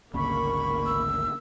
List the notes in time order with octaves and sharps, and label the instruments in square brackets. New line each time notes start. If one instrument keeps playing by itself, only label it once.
[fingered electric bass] G#1 D2 C#3 [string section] A#3 [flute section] B5 C#6
[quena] E6